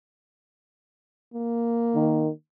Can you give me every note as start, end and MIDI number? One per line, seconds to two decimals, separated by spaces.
1.34 2.31 58
1.95 2.30 51